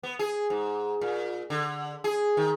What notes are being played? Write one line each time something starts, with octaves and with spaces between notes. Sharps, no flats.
B3
G#4
G#2
A#2
D3
G#4
D#3